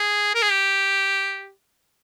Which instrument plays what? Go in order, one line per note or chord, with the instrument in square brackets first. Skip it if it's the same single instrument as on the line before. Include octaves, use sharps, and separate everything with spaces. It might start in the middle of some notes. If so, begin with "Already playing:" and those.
Already playing: [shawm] G#4
A#4
G#4
G4